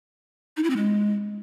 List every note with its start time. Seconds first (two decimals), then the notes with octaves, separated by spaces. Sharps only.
0.57 D#4
0.63 E4
0.70 C4
0.77 G#3